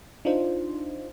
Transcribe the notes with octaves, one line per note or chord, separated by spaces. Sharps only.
D4 D#4 F4 C5